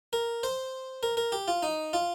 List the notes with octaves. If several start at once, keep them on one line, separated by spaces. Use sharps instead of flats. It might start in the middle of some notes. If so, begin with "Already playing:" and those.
A#4
C5
A#4
A#4
G4
F4
D#4
F4